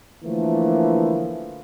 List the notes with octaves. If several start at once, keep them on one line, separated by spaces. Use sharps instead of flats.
D3 E3 F3 A3 A#3